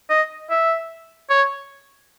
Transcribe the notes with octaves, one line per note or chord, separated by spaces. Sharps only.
D#5
E5
C#5